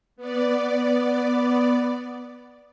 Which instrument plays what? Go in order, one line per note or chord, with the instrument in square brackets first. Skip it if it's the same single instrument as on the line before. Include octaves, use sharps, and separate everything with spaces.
[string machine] B3 D5